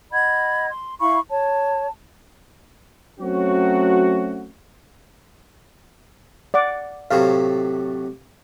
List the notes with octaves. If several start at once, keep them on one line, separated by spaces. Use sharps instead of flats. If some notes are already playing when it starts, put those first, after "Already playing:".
D#5 F#5 B5 G#6
C6
E4 F5 B5 C#6
C#5 A5
F#3 A3 C4 C#4 F#4
D5 F#5 D6
A2 C3 F#3 F5